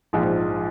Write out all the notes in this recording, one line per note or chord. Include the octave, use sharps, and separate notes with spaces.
A#1 G#2 F3